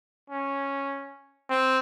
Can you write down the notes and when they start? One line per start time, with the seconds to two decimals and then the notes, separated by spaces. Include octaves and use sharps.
0.30 C#4
1.50 C4